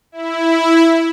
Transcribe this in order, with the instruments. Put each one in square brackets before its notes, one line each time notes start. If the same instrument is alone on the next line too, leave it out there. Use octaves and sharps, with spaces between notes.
[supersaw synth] E4